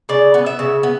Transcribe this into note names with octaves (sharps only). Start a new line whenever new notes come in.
C#3 D5
B3
E5
C#3
B3